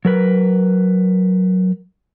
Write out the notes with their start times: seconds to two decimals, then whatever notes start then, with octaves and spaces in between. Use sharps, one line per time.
0.05 F#3 A#4 B4